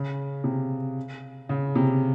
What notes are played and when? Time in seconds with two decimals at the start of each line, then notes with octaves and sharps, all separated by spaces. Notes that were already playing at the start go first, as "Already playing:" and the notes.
Already playing: C#3
0.44 C3
1.49 C#3
1.75 C3